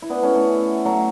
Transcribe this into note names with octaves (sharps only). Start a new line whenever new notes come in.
E4
B3 D4
A3 C#4
A3 C#4
F#3 A3